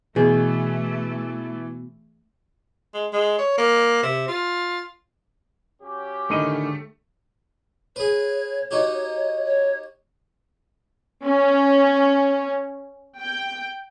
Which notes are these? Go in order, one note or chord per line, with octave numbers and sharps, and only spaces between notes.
B2 E3 A3 G#4
G#3
G#3
C#5
A#3
C3
F4
F#3 C#4 G4
A2 D3 D#3 A3 D#5
G#4 B4 C#5
D#4 F#4 G4
C#5
C#4
G5